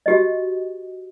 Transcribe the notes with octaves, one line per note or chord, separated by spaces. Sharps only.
F#4 G4 D#5